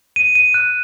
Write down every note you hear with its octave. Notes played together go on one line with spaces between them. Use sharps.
D#7
D#7
F#6